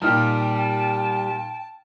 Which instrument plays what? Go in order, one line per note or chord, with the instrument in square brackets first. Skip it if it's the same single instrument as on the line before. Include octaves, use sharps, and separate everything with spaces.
[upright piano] A#2 D#4 F6 [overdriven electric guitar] G3 G4 [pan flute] G5 [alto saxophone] A5